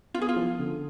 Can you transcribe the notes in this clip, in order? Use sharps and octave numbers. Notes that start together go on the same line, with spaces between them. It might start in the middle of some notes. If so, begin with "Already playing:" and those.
B3 F4
G#4
F4
F3
D3